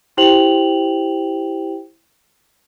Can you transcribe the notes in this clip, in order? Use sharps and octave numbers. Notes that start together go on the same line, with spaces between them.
E4 G4 C5 G5 F7 F#7